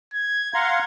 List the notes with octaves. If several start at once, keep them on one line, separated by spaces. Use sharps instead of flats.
G#6
F5 F#5 A#5 C6